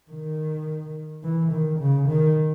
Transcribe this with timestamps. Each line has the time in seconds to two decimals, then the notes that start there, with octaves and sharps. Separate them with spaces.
0.11 D#3
1.23 E3
1.52 D#3
1.79 C#3
2.08 D#3